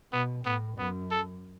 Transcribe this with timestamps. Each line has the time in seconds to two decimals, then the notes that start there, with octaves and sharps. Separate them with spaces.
0.12 B2 B3
0.45 A2 B3
0.78 F#2 B3
1.11 A4